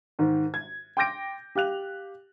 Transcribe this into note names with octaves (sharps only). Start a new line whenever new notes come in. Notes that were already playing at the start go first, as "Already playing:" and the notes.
G#2 D#3
G#6
G5 C6 D6 G6 A#6 D7
G4 F5 F#6 F7